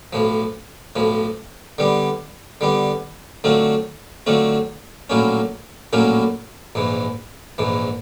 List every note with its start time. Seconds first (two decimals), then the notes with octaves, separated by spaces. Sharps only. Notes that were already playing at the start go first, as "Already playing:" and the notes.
0.13 B1 A2 F3
0.96 B1 A2 F3
1.78 D3 G3 B3
2.61 D3 G3 B3
3.44 D3 F#3 A3 C4 F4
4.26 D3 F#3 A3 C4 F4
5.10 A#1 A2 F#3 A#3 C#4
5.93 A#1 A2 F#3 A#3 C#4
6.75 A#1 G#2 E3
7.58 A#1 G#2 E3